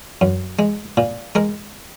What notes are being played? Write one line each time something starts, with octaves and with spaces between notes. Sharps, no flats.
F#2
G#3
A#2
G#3 A#4